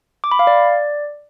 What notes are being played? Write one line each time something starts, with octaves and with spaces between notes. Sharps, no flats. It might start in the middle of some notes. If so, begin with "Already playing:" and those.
D6
B5
F5
D5